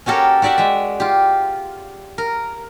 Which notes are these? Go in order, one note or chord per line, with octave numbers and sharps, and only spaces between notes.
C#4 F#4 G4 A4 A#4 C#5
F#4 G4 D5 E5 F#5
G#3 E5
F4 G4
A#4